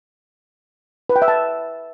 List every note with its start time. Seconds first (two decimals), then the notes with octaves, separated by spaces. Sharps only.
1.09 B4
1.16 G5
1.22 E5
1.28 A5